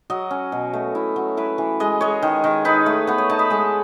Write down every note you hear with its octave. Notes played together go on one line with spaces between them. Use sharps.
F#3 D#5
C#4
B2
A3
E4
F#3
E4 B4
E3
G#3 D#5
G#3 C#5
D#3
D#3
D#4 B4
A3
B3 B4
C#5
D#4 A5
B5
G#3 A5